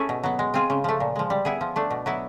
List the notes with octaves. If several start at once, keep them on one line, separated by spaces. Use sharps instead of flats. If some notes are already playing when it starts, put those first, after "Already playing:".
Already playing: A3 C#4 E4 G#4
B2
F#3 B3
G#3
C4 F4 G#4
C#3
F3 A3
A#2
F3 G#3
G3
B3 E4 G#4
F3
A3 D4
B2
F#3 B3 E4